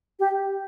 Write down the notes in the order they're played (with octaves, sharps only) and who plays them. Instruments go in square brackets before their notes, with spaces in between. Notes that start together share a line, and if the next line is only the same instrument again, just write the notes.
[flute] G4